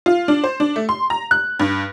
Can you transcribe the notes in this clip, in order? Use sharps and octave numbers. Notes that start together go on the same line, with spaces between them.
F4
D4
C5
D4
A3
C6
A#5
F#6
G2